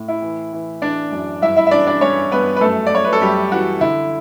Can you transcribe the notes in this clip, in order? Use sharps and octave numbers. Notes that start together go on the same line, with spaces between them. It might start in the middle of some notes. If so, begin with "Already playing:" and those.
Already playing: A2
E4
E3
E3
E3 D4 D5
F#2
G2 E4 E5
E4 E5
E5
E3 D4 D5
D4 D5
G2 C#4 C#5
G2 B3 B4
B4
F#2 A3 A4
D5
F#2 C#5
B4
A4
F#2 G3 G4
E3 F#4
D3 E4